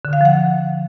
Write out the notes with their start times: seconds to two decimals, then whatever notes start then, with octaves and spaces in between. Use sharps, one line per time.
0.05 D3
0.13 F5
0.21 F3 F#5